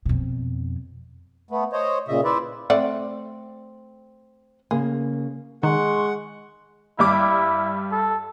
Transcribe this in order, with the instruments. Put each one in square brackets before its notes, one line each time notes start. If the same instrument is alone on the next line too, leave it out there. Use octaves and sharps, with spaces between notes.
[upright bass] F2 B2
[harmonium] A3 B3
C5 C#5 D#5
A#2 C#3 D#5 E5
E4 B4 C5 D5 E5
[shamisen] A3 D5 F#5 [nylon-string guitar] C4
[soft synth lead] C#3 [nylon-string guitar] A#3 [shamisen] G#4
[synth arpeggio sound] D#3 [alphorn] G#3 [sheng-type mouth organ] F#5 [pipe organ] C6 C#6
[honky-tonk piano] G2 G3 D6 [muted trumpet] E4
[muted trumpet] A4